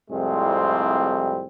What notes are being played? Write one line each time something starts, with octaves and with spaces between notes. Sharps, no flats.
C2 F2 A2 G3 G#3 C4